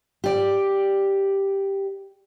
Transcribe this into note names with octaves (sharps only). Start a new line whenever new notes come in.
G4 D5